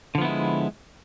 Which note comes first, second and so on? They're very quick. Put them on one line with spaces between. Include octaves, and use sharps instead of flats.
D3 F3 B3 E4 G#3